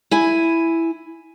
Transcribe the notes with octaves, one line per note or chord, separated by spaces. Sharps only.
E4 G#5